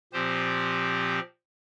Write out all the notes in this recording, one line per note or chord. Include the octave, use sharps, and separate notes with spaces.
A#2 F3 C4 G4 C5